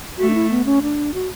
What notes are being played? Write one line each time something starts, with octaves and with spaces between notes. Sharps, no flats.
A3 F#4
D4
E4
B3
C#4
D4
F#4